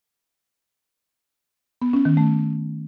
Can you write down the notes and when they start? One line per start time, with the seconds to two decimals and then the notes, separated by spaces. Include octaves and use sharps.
1.82 B3
1.93 C#4
2.05 D#3
2.17 A3